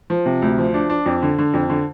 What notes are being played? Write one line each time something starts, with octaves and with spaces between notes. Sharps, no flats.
F3
C3
D2
F3
D4
D4
F2
D3
D3
F2
D3